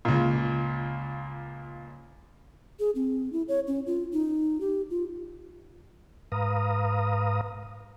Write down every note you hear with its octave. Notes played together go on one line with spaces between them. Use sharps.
C#2 A#2
G#4
C4
E4
C#5
C#4
F4
D#4
G4
F4
G#2 B4 F5 A#5 D#6